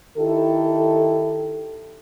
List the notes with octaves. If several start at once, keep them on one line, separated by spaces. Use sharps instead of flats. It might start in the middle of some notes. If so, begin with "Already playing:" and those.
D#3 E4 G4 A4